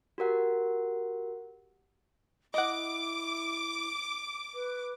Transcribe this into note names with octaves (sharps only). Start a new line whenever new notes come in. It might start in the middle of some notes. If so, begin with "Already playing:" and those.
F#4 G4 A#4 F#5
E4 D#5 F#5 D6
B4